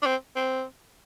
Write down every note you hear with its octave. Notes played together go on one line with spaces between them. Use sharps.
D4
C4
C4